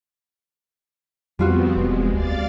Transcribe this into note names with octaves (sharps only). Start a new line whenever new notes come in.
F2 F3 G3 B3 C4 F4 F#4
E1 G#3
D2 D5 F5 A6